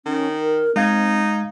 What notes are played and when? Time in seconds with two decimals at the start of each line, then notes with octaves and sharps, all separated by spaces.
0.06 D#3 C#4
0.41 A#4
0.76 G#3 C4 D#4 F5 G#6